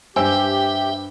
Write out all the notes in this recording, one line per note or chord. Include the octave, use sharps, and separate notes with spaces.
G2 G4 C5 E5 G5 G#5 E6